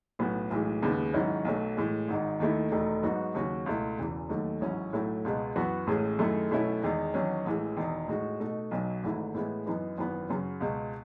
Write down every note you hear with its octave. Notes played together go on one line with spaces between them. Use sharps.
B1 A2 F#3 B3
B1 A2 E3 G#3
D#2 C#3 G#3 B3
G#2 D#3 F#3 C#4 E4
B1 B2 F#3 A3
A2 E3 G#3
G#1 G#2 D#3
D#2 D#3 A3 E4
E1 E2 D#3 A3
G#2 F#3 B3 D#4 F#4
D#2 C#3 F#3 C#4 F#4
C#2 B2 A3 E4
E1 E2 C#3 E3
D#2 D#3 F#3 A3
A1 G#2 F#3 C#4 E4
B1 A2 F#3 A3 E4
C#2 B2 G#3 B3
F#2 E3 B3 F#4
A1 A2 G#3 C#4 G#4
F#2 D#3 A3 E4 G#4
B1 B2 A3 C#4 E4
E2 D#3 G#3 D#4
E2 D#3 F#3 C#4
A1 A2 E3 G#3
E1 E2 D#3
A2 G#3 D#4 F#4
B2 A3 D#4 F#4
B1 B2 F#3
G#1 G#2 E3 A3 E4
A2 E3 G#3 B3 E4
F#2 E3 B3 D#4
G#1 F#2 E3 B3
F#2 C#3 F#3
C#2 B2 G#3